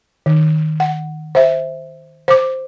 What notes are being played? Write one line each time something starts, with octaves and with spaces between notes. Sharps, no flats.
D#3
F#5
C5 E5
C5 D6